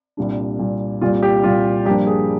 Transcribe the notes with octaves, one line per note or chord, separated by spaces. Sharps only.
C2 A#2 G3 D4
C2 A#2 G3 D4
C2 A#2 G3 F4
G4
C2 A#2 G3 F4
G2 F3 A#3 D4 G4
G#4